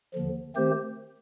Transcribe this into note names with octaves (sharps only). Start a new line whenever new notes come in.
D#2 D3 F3
D#3 A3 C4 G4 C5